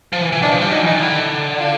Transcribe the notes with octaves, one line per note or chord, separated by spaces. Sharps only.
F3
E3
E3
D#3 D4
F3
G3
F#3 D#4
E3 D#4
D#3
D3 E4
F4